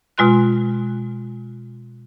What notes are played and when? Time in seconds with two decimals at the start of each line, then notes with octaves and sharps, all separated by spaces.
0.18 B2 G#3 F4 C6 F#6